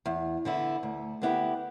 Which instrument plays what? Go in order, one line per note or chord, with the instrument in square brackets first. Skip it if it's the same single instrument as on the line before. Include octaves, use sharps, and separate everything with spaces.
[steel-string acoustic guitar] E2
D3 B3 E4
D2
D3 B3 E4 G4